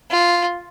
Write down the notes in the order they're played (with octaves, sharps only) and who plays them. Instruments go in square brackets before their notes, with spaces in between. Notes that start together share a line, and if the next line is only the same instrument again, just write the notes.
[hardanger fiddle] F4